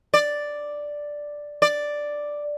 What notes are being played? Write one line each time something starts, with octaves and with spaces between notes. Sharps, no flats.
D5
D5